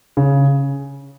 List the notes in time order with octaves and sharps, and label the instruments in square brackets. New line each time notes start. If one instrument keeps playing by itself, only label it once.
[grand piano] C#3